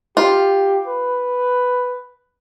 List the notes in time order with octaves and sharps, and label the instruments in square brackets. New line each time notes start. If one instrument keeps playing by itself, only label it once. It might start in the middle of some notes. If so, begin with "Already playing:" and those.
[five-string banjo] F4 [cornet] G4
[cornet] B4